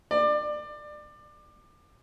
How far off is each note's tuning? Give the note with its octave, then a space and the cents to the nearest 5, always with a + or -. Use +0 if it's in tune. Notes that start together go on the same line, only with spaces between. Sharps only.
D5 +25